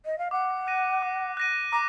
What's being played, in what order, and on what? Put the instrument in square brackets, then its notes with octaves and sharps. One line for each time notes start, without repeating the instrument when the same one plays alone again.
[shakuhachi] D#5
F5
[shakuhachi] F#5 [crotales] D6
[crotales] F#6 A#6 D#7
D6
F#6 A#6 D#7
[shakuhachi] A#5 [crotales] D6